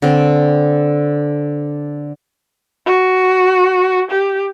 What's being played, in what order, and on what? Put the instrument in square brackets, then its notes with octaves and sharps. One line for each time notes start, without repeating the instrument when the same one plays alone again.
[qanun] D3 C4
[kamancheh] F#4
G4